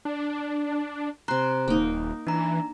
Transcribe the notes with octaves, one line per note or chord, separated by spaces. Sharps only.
D4
C3 A#5 C6 F#6
D#1 A#3 D#4
E3 D4 A#5